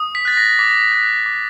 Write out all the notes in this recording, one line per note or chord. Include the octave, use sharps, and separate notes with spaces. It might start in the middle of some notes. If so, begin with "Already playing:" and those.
Already playing: D#6
B6
F#6 A6
A#6
D6 B6
A#6
B6
F#6
D6